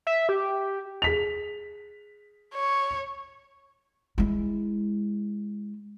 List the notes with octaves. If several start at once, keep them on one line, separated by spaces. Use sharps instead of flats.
E5
G4
G#4 B6 F7
C#5
G#3 E4